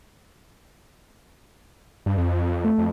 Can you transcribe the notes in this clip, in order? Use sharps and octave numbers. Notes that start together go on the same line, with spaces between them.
G2
F2
A3
F2